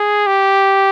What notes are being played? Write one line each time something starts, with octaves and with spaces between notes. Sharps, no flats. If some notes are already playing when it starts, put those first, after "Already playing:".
Already playing: G#4
G4